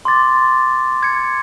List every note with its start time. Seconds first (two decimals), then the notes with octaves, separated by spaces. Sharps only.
0.05 C6 D6 A6
1.03 G#6 C#7